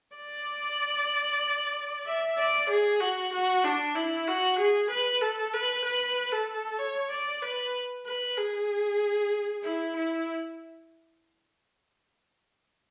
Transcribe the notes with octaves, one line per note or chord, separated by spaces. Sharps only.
D5
E5
D5
G#4
F#4
F#4
D4
E4
F#4
G#4
B4
A4
B4
B4
A4
C#5
D5
B4
B4
G#4
E4
E4